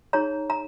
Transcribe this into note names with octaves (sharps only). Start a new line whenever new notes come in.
D#4 G#4 C#5 A#5
A#5